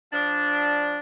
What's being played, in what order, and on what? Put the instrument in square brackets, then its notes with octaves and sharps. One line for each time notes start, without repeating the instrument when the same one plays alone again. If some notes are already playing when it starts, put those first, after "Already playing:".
[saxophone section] F3 D4